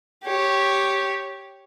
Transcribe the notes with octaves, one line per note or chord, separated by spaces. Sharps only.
G4 C#5